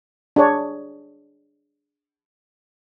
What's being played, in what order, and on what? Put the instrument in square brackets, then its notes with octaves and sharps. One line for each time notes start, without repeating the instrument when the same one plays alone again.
[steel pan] D4 G#4 C#5